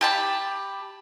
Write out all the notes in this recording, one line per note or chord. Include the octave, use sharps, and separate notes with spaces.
G4 A5 B5